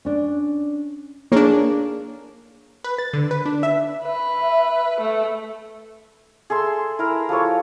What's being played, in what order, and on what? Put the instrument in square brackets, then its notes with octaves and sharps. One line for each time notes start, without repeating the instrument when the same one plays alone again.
[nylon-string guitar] C#4 D4
[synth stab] A#3 D4 [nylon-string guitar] G#4 C#5
[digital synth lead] B4
A6
D3
B4
D4
E5
[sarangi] B4 [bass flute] E5
[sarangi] A3
[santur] G#4 A4 E5 C6
E4 A#4 A#5
F3 G4 A4 C#5